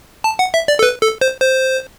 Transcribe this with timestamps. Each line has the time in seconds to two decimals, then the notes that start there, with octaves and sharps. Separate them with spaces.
0.24 A5
0.39 F#5
0.54 E5
0.68 D5
0.79 A4
0.83 B4
1.02 A4
1.21 C5
1.42 C5